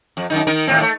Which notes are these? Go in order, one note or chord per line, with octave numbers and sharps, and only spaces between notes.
F2
F#2 D#3 D#4
D#3 D#4 A#4
D#2 A2 C4
A3